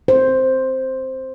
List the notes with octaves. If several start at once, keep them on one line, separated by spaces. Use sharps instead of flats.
C5